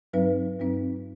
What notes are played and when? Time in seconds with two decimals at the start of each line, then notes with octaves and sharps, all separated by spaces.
0.13 G2 F#3 C4 D#4 B4
0.60 G2 F#3 C4 D#4